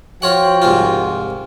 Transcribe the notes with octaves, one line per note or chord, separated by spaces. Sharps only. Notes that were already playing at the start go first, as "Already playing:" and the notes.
F3 F4 F#4 C#5 F#5 G5
C2 G#2 F4